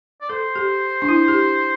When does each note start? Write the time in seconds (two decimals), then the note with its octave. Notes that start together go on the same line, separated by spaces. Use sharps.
0.21 D5
0.29 A4 C5
0.56 G4
1.02 D4
1.09 E4
1.28 G4